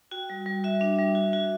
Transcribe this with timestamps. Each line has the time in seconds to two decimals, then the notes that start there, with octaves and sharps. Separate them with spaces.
0.11 F#4 G5
0.30 G3
0.46 G3
0.64 F#4 E5
0.81 D4
0.98 G3
1.15 F#4
1.33 F#4